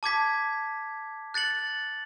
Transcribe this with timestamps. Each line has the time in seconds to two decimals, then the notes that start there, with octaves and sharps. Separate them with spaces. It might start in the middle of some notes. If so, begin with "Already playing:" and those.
0.03 A5 D6 G#6 B6
1.34 F#6 A6 C#7 F#7